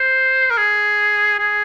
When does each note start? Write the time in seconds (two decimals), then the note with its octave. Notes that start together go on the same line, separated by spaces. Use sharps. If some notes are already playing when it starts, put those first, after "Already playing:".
Already playing: C5
0.51 A#4
0.58 G#4
1.39 G#4